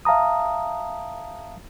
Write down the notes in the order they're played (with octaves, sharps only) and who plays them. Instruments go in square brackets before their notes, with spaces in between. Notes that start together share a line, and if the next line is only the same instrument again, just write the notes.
[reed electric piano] E5 F5 A5 A#5 D#6